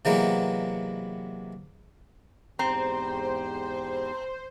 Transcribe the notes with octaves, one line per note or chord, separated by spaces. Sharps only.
C3 E3 F#3 G#3 A#3 B3
E2 G#2 C4 G4 C5 A#5